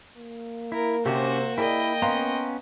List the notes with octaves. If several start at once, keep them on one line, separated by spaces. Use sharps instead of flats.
A#3
E4 A#4
C3 C4 C#4 F#4 G4 C5
E4 G#4 A#4 D5 D#5 G5
B3 C#4 F5 A#5 C6